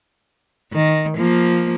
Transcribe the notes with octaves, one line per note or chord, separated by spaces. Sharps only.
D#3
F3 A#3